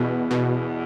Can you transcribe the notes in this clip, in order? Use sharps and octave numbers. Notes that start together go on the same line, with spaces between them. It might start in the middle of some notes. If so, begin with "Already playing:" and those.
Already playing: E2 B2
B2